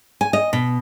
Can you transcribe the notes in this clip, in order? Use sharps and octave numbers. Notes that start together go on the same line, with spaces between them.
G#5
D#5
B2